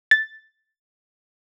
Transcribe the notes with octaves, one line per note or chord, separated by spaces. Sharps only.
A6